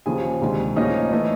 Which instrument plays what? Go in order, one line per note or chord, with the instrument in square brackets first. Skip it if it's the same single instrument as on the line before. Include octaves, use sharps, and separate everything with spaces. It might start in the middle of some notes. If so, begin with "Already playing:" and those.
[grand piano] D#2 C#3 F3 G#4 G#5
D2 C3 D#3 G#3
A2 F3 A#3 C#4 D#4 D#5
E3 A3 C#4